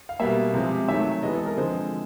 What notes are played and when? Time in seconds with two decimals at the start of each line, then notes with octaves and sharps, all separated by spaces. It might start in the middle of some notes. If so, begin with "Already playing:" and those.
0.09 F5
0.20 B2 G3 A#3 E5
0.54 C3 F3 G#3 C4
0.89 D#3 F#3 A3 E5
1.23 C3 E3 G#3 B3 D#5
1.35 A4
1.46 A#4
1.57 D3 F3 G#3 C4 C5